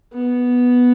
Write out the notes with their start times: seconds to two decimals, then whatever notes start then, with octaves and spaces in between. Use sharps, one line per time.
0.13 B3